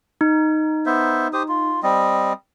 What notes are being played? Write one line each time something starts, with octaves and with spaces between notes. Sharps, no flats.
D#4
B3 C5 E5
G4 C5 D#6
F4
G3 C4 D#5